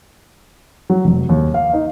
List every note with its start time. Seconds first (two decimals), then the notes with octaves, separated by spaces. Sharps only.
0.90 F#3
1.05 F1
1.29 D#2
1.54 F5
1.73 D#4